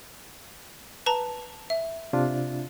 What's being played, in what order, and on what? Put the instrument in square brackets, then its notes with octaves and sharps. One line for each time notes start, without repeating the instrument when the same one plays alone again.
[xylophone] B4 A5 A#5
E5
[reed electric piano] C3 D4 F4